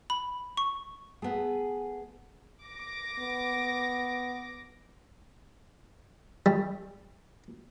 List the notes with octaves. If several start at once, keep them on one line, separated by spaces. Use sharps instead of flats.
B5
C#6
A3 B3 G#4
D6 A#6
B3
G3